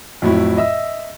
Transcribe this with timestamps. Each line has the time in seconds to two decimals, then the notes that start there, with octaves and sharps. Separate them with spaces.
0.22 F2 A2 F#3 E4
0.57 D#5 E5 E6